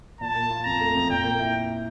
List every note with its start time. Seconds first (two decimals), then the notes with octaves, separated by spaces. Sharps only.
0.21 A#2 A5
0.35 A#3
0.50 F4
0.65 F2 A#5
0.80 A3
0.95 F2
1.10 A#2 G5
1.24 A#3
1.39 E4